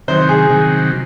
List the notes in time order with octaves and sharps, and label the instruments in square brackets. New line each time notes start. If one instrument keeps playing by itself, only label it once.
[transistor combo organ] C3 D#3 F#3 [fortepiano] C5
[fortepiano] G#4
[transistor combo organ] C3 D#3 F#3